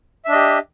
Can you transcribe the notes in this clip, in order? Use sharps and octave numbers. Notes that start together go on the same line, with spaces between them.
D4 G4 D#5 E5